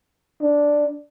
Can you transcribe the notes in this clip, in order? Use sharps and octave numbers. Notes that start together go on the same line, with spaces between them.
D4